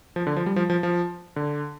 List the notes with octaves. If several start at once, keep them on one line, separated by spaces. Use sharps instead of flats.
F3
D3
F3
G3
F3
F3
F3
D3